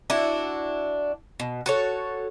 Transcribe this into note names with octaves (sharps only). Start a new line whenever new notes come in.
D4 E4 F#4
B2
F#4 A4 C#5